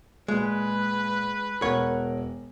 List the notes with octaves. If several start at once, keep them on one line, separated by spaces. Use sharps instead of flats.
A#2 G#3 B4 G#5
E1 A#4 C#5 F#5